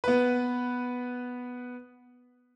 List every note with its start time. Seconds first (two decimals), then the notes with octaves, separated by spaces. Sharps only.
0.04 B3 B4